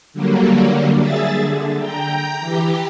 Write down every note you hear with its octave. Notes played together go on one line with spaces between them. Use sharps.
D3 F#3 G3 A#3
G#4 E5 A6
D3
G5 A#5 G6
E3 G4